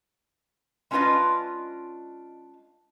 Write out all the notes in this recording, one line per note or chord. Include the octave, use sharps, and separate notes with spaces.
G#3 C#4 D4 F4 B4 D#5